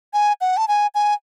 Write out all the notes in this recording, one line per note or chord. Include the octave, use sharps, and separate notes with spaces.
G#5
F#5
A5
G#5
G#5